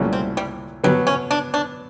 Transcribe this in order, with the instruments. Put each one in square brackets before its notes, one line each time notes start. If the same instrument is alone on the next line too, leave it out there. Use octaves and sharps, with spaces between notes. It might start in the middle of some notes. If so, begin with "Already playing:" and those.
Already playing: [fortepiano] C2 A#2 F#3 A3 C#4
[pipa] C4
G3
[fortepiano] B2 F#3 B3 [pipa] G3
[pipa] C#4
D4
D4